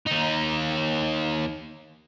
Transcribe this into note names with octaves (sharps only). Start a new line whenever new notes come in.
D#2 D#4